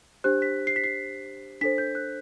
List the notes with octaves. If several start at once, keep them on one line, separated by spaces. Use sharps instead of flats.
D4 G4 C5 F#6
B6
C7
B6
C7
D4 A4 C5 B6
G6
F#6